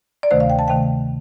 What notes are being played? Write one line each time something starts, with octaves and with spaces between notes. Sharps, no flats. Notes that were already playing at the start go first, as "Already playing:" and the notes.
D5
D2 C3 D#3 A3 C5
F5
G5
A5
C3 D#3 A3 G5